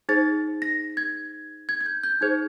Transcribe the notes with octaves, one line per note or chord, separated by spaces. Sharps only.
D#4 G#4 C5 A6
A#6
G#6
G#6
G#6
G6
G6
D#4 G#4 C5 G#6